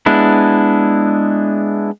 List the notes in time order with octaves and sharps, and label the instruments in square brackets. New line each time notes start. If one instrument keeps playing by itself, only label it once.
[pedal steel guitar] G#3 B3 D4 E4